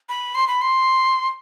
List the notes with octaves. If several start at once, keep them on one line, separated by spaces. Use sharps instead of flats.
B5
C6
B5
C6